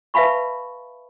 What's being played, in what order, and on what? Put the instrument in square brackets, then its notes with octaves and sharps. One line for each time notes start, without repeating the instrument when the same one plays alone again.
[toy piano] B4 E5 F5 A5 B5 C#6